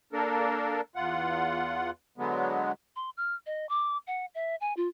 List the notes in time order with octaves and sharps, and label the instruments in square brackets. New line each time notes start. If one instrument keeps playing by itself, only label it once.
[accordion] A#3 D4 A4 A#4
E2 F4 F#5
D3 F#3 G#3 B3
[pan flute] C6
F6
D#5
D6
F#5
E5
G#5
F4